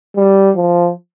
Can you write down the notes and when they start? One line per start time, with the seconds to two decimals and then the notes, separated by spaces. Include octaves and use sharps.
0.16 G3
0.56 F3